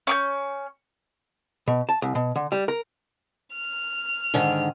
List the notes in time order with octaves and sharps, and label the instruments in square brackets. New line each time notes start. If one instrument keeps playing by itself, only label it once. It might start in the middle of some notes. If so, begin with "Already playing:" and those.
[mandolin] C#4 D6 G6
[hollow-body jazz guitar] B2
A5
C2
B2
D3
G3
A#4
[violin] F6
[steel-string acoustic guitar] G#2 D3 D#3